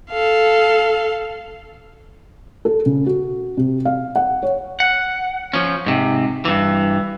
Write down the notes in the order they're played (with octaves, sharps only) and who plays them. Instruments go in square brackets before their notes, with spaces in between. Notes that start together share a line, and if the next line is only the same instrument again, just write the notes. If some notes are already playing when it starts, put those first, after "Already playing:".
[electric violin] A4 F5
[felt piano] A4
C#3
F#4
C3
F5
F#5
C#5
[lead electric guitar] F#5
F3 C#4
G#2 C3
G2 E3